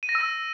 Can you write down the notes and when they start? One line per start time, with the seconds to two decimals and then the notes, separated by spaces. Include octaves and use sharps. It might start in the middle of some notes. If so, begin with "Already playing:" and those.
0.03 D#7
0.09 A#6
0.15 E6
0.21 A#6